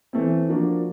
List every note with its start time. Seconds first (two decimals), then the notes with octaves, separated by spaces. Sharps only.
0.13 E3 A3 C4
0.49 F3 A#3 D4 F#4